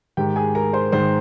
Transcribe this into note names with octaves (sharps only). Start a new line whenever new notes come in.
G#2 D#3 G4 G5
G#4 G#5
A#4 A#5
C5 C6
G#2 D#3 C5 C6